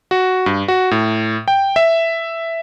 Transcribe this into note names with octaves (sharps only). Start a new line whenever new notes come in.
F#4
G2
F#4
A2
G5
E5